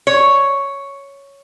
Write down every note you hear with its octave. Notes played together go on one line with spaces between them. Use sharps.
C#5